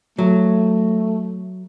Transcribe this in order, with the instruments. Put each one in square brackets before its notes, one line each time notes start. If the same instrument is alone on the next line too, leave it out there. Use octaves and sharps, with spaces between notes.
[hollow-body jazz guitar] F#3 [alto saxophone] A3